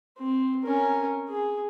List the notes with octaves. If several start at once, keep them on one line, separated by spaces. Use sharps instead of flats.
C4
C#4 A#4
G#4